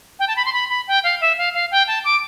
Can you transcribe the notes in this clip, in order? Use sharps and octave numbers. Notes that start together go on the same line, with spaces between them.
G5
A5
B5
C6
B5
B5
G5
F5
E5
F5
F5
G5
A5
D6